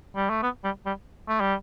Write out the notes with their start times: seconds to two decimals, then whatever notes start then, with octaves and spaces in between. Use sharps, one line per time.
0.16 G3
0.30 A3
0.43 B3
0.64 G3
0.86 G3
1.28 A3
1.41 G3